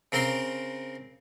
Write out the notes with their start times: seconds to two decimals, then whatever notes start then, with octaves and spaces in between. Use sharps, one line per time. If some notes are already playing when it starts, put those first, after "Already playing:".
0.12 C#3 C4 A#4 A#5 C6